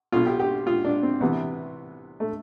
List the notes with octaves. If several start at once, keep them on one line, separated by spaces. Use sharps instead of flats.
B1 B2 F4
G4
G4
F4
D4
C4
C2 C3 E3 B3
A3